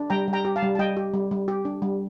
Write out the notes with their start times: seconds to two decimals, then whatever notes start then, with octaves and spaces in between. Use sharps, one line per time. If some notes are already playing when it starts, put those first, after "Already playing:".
Already playing: D4
0.10 G3 G5 A#5
0.28 G3
0.33 G5 A#5
0.45 G4
0.56 F5 A5
0.62 G3
0.75 A5
0.79 G3 D#5 G5
0.97 G4
1.14 G3
1.31 G3
1.48 G4
1.65 D4
1.82 G3